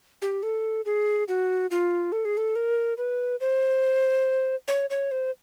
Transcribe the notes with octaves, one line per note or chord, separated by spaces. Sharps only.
G4
A4
G#4
F#4
F4
A4
G#4
A4
A#4
B4
C5
C#5
C#5
C5